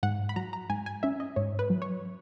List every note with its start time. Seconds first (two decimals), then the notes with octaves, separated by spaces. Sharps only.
0.03 G#2 F#5
0.29 B5
0.36 F#3 A#5
0.53 A#5
0.70 G#2 G#5
0.86 G#5
1.03 C#4 E5
1.20 D#5
1.36 G#2 C#5
1.59 B4
1.70 F#3
1.82 C#5